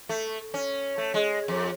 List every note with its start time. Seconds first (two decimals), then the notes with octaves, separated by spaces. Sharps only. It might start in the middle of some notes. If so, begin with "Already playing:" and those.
0.09 A3
0.54 C#4
0.98 A3
1.14 G#3
1.48 F2